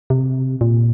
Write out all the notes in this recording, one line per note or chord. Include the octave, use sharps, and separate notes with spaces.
C3
A#2